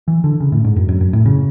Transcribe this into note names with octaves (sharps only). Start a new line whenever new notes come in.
E3
D3
C#3
A2
G#2
F#2
F#2
F#2
A2
C#3